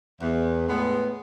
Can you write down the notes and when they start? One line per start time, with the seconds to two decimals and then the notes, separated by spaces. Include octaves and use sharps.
0.21 E2
0.68 A2 G#3 B3